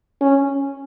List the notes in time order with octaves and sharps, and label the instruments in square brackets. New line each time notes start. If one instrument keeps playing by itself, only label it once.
[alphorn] C#4